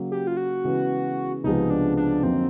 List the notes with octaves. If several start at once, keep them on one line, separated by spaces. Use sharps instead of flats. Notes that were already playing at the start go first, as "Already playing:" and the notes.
Already playing: C#3 F#3 A#3
G4
F4
F#4
C#3 E3 G#3 B3
C#2 C3 F3 G#3 B3 D#4
D4
D4
F2 D3 F#3 A#3 C4 D#4